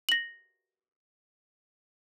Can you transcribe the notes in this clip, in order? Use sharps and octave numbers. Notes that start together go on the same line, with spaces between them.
A#6 F#7